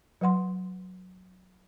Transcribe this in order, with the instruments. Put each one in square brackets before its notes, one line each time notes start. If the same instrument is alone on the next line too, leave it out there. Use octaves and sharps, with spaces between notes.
[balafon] F#3 B4 F#5 C6